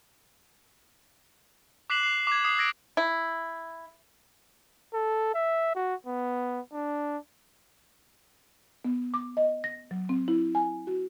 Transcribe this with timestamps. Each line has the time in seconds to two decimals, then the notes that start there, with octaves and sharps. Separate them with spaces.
1.90 D6 F#6 B6 C7 E7 F#7
2.03 C7
2.27 D6 G#6
2.44 D#6 C7
2.58 E6 G#6 A#6 B6 D7
2.97 E4
4.94 A4
5.34 E5
5.75 F#4
6.06 B3
6.73 D4
8.85 B3
9.14 D6
9.37 D#5
9.64 A#6
9.91 F#3
10.09 C4
10.28 E4
10.55 G#5
10.87 F#4